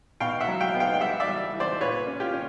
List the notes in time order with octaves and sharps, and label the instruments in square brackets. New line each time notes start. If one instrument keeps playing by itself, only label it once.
[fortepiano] B2 F5 G5
E5 F#5
F#3
F5 G5
B3
F5 G5
G5
G3 E5 F#5
D5 E5
G3
E3
C5 D5
A#2 B4 C#5
C#4
F4 G4
C#4